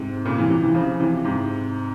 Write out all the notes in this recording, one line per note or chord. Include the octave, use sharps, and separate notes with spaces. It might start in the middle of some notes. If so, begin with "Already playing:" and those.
Already playing: G#2 C3
A#2 C#3
C3 E3
C3 E3
C3 E3
C#3 F3
C3 E3
G#2 C3